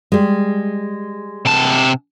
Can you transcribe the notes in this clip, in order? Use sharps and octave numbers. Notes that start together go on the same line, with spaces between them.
G3 G#3
C3 A5